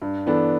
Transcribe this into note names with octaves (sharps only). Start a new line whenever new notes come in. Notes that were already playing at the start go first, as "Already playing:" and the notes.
G2
E3 B3 D4 A4